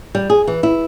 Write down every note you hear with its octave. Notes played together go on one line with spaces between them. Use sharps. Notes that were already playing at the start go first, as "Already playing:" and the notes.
G3
G#4
E3
E4